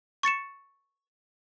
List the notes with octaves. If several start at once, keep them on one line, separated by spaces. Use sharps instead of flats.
C#6 A6 C#7 E7